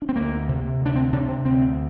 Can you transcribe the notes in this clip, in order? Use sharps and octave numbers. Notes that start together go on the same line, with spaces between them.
D4
C4
D2 A#3
C3
D2 D4
C4
C3 D4
C4
D2 C4